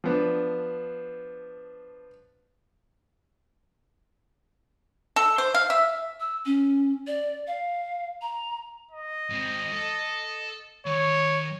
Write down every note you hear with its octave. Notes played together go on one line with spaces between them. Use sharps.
F3 B3 D4
A4
C5
F5
E5
E6
C#4
D5
F5
A#5
D#5
G#2 C4
A4
D#3 C#5 B5